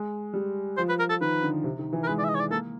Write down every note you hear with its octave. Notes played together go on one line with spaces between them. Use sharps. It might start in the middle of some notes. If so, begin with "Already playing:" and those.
Already playing: G#3
G3
F3 C5
B4
A#4
A4
D#3 B4
D3
C3
D#3
E3
A#4
G#3 B4
D5
E5
D#5
C#5
D5
A#3 A4